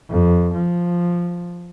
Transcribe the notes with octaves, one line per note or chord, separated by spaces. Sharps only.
F2
F3